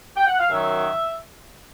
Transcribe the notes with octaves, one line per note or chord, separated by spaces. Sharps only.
G5
F#5
F5
F#2 D#3 F#3 E5